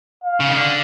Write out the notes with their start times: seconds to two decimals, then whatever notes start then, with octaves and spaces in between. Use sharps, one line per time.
0.24 F5
0.40 C#3
0.49 D#3
0.57 D3